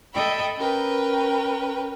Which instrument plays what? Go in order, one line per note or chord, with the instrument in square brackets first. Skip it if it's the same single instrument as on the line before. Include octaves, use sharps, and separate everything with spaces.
[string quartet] A4 D#5 E5 G5 B5
C#4 A#4 B4 G5